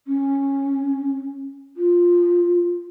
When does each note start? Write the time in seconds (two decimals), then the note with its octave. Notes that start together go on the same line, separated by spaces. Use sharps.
0.07 C#4
1.77 F4